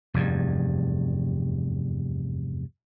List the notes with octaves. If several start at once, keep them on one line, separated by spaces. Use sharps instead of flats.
F1 E2 G2